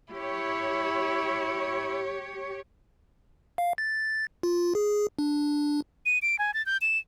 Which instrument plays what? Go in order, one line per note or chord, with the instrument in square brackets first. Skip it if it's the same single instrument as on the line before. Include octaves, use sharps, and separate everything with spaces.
[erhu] E4 [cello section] G4 C#5
[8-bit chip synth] F5
A6
F4
G#4
D4
[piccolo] D#7
D7
G#5
A6
G6
E7